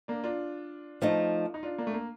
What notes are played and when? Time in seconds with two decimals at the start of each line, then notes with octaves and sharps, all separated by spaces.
0.08 A#3 D4
0.24 D4 F4
1.02 F3 A3 D#4
1.54 D#4
1.63 D4 F4
1.78 A#3 D4
1.87 A3
1.94 A#3